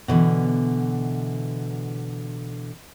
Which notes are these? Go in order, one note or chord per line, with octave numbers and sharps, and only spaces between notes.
B2 D3 E3